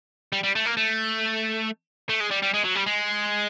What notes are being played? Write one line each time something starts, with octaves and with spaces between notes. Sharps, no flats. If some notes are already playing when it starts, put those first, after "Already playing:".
G3
G3
A3
A#3
A3
A3
G#3
G3
G3
G#3
F#3
G3
G#3